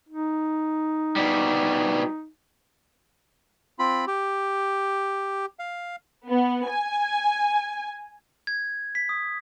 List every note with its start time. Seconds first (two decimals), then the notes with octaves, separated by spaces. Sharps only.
0.09 D#4
1.16 B2 G3
3.79 C4 F4 B5
4.07 G4
5.59 F5
6.28 B3
6.68 G#5
8.47 G#6
8.95 B6
9.09 D#6